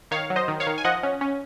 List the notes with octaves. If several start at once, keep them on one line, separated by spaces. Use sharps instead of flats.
D#3 C#5 F5
F#3
C5 D#5
D#3
C#5 F5
D#3
G#5
F3 D#5 F#5
C#4
C#4